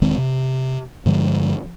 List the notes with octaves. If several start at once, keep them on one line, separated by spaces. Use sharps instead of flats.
E1 D#3 G#3 C4
C3
G2 D3 F3 G#3